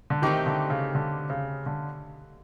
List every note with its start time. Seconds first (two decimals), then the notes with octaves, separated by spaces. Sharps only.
0.10 D3
0.22 D#3 A3 C4 D#4 G4
0.46 D3
0.70 C#3
0.95 D3
1.30 C#3
1.66 D3